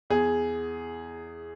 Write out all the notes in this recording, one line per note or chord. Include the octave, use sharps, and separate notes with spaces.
E2 G#4